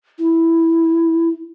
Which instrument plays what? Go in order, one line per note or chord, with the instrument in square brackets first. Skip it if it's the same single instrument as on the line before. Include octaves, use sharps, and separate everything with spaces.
[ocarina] E4